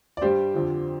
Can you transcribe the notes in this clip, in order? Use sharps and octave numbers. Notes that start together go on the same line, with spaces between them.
D5
G2 G3 G4 C5
F2 D3 F3